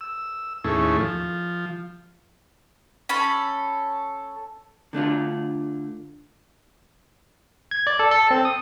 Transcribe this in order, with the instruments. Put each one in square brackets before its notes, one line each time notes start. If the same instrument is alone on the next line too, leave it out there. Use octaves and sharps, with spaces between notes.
[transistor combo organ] E6
D#2 A2 A3 C#4 E4 G#4
F3
[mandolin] C#4 A4 B5
[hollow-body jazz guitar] D3 A3 D4 F4
[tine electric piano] G#6
D5
A4
A4
C4
D#6